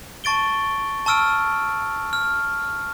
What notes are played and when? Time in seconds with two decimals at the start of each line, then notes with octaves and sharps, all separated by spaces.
0.24 A5 C#6 A6 D7 G7
1.06 A5 C#6 E6 F6 D7
2.13 F6